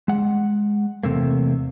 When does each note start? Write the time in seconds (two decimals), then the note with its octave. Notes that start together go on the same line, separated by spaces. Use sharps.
0.08 G#3 F#5
1.03 E2 C3 A3 A#3